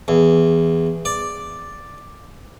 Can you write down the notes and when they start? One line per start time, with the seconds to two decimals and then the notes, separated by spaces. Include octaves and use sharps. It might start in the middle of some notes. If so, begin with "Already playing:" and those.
0.08 E2
1.05 D5